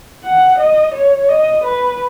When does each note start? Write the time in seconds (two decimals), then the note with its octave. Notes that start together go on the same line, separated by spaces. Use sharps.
0.24 F#5
0.59 D#5
0.95 C#5
1.29 D#5
1.65 B4